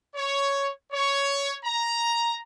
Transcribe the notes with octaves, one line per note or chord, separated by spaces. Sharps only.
C#5
C#5
A#5